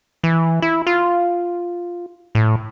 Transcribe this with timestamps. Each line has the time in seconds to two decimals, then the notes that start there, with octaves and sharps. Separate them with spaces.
0.24 E3
0.62 E4
0.87 F4
2.35 A2